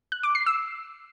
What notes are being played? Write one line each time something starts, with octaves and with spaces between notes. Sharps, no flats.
F#6
D6
C7
E6